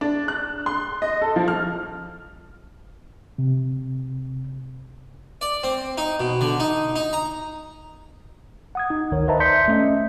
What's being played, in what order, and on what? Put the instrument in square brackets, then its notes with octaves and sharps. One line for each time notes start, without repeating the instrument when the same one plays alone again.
[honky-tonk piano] D4
F#6
C6
D#5
A4
F3
F6
[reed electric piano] C3
[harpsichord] D5
C4
D#4
B2
D3
D#4
D#4
A#5
[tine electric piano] F#5 D#6 G#6
D#4
G1 D2 D#3 A#4 C#5
B4 C5 D#5 E5 A5 A#5
D5 E5 C6 G6 B6 C#7
A3 C#4 D#5 E5